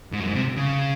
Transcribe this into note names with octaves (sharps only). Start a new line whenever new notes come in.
G#2
F#2
G#2
C3
C#3